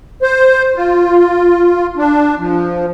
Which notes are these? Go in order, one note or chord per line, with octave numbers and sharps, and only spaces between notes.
C5
F4
D4
F3